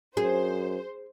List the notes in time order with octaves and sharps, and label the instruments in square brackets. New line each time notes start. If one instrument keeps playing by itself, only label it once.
[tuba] F#2 [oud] G#4 [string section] C5